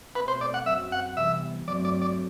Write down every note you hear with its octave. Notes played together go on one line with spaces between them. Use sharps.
B2 A3 C4 B4
C5
D5
F#5
F#2 F#3 C4 E5
F#5
C3 E3 G3 B3 E5
G2 F#3 A3 C4 D5
D5
D5